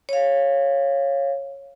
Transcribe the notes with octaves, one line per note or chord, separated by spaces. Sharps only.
C#5 F5